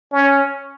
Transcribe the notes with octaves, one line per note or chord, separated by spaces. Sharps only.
C#4